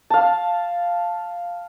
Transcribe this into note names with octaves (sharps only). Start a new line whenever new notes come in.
F5 A5